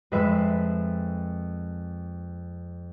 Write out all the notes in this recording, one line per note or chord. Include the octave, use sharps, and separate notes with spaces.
F2 G#3 B4 E5 B5 E7